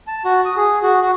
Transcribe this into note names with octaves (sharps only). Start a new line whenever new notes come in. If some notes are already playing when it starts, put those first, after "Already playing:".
A5
F#4
D#6
G#4
F#4
F#4